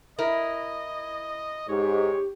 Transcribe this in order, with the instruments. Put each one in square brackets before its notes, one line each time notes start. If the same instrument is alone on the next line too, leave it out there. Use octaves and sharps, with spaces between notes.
[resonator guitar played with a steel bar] E4 A#4 [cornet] D#5
[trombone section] G#2 [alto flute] G4 [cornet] C#5